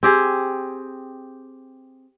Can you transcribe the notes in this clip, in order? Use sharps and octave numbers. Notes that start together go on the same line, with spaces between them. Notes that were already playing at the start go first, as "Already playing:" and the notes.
C4 G4 G#4